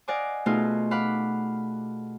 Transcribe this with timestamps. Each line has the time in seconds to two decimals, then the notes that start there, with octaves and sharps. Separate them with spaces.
0.08 D5 D#5 F5 F#5 G#5 D6
0.46 B2 A3 B3 D#4 F4 G#4
0.91 F5 F#5 B5 D6